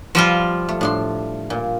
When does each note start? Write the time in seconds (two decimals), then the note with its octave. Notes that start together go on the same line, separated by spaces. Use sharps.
0.15 F3 G3 F4 B4 F5 F#5
0.69 A3
0.81 A2 D4 C6
1.50 A#2